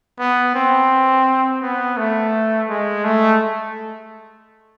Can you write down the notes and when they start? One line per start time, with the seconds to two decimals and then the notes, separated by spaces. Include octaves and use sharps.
0.19 B3
0.55 C4
1.62 B3
1.97 A3
2.69 G#3
3.04 A3